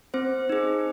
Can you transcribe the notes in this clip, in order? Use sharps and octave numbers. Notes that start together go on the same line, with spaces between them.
C4 C5
D#4 G#4